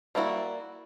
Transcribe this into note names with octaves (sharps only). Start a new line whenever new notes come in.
G3 A#3 D4 E4 F#4